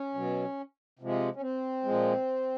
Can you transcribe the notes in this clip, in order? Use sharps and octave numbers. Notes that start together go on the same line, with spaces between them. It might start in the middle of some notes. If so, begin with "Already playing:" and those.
Already playing: C#4
B2 F#3
C3 F3 G#3
C#4
C4
A#2 F3 G#3